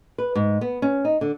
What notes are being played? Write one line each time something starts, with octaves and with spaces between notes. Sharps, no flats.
B4
G#2
B3
C#4
D#4
D3